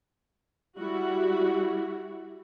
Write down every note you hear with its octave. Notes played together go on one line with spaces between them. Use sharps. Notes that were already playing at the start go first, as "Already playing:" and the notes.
G3 E4 F#4